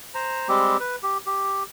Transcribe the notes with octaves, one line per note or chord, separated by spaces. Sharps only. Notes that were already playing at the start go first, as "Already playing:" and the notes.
C5 A#5
G3 G#3 C4 G4
B4
G4
G4